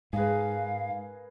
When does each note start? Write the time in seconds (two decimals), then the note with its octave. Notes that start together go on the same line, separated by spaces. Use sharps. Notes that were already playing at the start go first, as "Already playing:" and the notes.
0.13 G#2 G#4 A#4 B4 F5